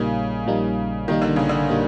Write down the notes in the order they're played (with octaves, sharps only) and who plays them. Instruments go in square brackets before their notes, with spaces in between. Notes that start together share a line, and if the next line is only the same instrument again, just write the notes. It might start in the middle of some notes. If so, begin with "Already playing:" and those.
Already playing: [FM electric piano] A#1 A#2 G3 A#3 D#4 [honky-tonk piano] C#3
[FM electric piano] A#1 A#2 G3 A#3 D#4
[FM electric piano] A#1 A#2 G3 A#3 D#4 [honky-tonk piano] D#3
[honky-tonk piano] D3
C#3
D3
[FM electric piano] A#2 G3 A#3 D#4